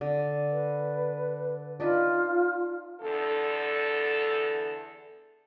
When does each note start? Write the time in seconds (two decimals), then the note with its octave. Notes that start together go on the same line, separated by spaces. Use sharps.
0.01 D3
0.52 B4
1.80 D4 D#4 F4 B4
3.02 E2 D3 A4